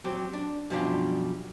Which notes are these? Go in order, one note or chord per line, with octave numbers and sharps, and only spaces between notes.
F#3 C4 G4
D4
F#2 B2 F3 G3 D4 F4